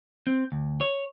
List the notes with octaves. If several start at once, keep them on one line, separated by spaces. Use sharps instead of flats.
C4
D2
C#5